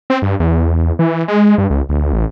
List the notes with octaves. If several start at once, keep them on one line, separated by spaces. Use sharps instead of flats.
C4
G2
E2
E3
G#3
G2
C#2
D2
A1